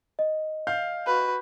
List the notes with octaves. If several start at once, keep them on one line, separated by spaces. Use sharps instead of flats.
D#5
F5 G6
F#4 B4